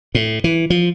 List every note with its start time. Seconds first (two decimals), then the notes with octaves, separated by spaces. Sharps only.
0.15 A2
0.44 E3
0.70 F3